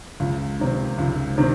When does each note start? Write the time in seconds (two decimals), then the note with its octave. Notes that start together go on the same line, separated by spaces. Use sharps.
0.20 C#2
0.60 C3 D#3
0.98 C#2
1.38 C3 D#3